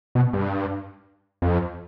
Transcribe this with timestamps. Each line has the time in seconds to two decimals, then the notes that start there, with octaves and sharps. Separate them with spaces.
0.15 B2
0.33 G2
1.42 F2